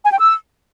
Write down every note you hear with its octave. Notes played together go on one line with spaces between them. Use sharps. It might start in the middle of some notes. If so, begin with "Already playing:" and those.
G#5
G5
E6